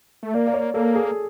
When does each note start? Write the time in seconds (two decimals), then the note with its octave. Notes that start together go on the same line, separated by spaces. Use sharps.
0.23 A3
0.34 A#3 D5
0.47 D5
0.54 C#5
0.74 A#3 A4
0.95 G#4